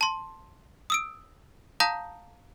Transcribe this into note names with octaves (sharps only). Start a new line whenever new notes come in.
A5 C6
D#6 E6 D7
F5 A5 A#5 D#6 G6 A#6